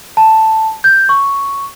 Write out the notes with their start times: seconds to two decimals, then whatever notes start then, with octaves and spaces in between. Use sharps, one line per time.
0.17 A5
0.84 G6
1.09 C#6